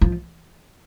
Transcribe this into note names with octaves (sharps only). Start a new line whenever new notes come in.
F3